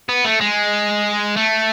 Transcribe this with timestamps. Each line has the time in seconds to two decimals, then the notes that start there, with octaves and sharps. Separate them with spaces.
0.09 B3
0.25 A3
0.41 G#3
1.36 A3